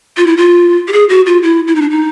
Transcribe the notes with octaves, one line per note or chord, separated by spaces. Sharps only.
F4
E4
F4
G4
G#4
F#4
F4
E4
E4
D#4
D4
D#4